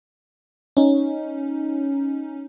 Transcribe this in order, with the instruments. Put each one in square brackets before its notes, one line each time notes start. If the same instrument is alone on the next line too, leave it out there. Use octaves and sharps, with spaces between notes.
[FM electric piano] C#4 D#4